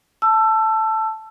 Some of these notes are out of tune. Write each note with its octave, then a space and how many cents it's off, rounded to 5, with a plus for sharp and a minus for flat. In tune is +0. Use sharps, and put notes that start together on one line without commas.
A5 +0 E6 +20